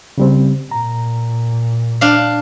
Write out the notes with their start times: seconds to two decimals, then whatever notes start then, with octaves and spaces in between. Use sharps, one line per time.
0.18 C#3 G3 C4
0.71 A#2 A#5
2.01 D4 F5